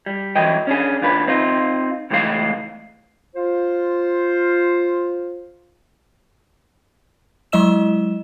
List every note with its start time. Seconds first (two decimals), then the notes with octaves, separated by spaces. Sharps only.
0.06 G3
0.36 E3 F#3 D#5 G5
0.67 C#4 D4 G#4
1.02 D#2 D4 F4 B4
1.27 C4 D#4 F4
2.10 C#2 A2 E3 G#3 F#4 F5
3.36 F4 C5
7.52 F#3 G#3 E4 D#5 E6 E7